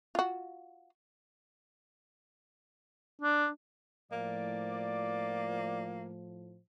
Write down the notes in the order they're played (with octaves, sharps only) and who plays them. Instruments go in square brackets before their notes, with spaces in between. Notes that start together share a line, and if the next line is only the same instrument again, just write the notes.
[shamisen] F4 F#4
[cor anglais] D4
[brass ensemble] A2 F3 [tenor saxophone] A#3 [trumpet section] D5